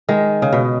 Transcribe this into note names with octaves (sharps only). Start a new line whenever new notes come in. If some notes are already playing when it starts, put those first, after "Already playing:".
D#3 G#3
C#3
B2